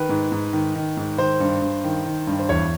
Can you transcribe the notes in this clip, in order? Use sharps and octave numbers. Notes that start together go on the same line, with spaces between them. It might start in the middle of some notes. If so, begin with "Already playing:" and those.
Already playing: D#3 B4
G#2
G#2
D#3
D#3
G#2
D#3 C5
G2
G2
D#3
D#3
G2
C5
E2 C#5